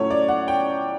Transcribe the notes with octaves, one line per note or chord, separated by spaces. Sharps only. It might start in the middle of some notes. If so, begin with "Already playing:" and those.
Already playing: A2 F#3 A3 C#4 C#5
D5
F#5
G5